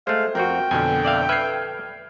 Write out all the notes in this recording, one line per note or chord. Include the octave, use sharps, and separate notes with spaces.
G#3 A3 C5 F5
F2 C4 F#4 A#4 G5
F2 B2 D3 G#5
D5 E5 F5
A4 B4 E5 F6 G#6 C7